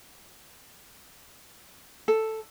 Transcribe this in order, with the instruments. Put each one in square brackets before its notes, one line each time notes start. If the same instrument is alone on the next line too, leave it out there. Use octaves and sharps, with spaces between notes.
[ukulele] A4